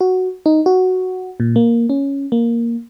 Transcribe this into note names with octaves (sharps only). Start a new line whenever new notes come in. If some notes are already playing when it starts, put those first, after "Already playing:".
F#4
D#4
F#4
A#2
A#3
C#4
A#3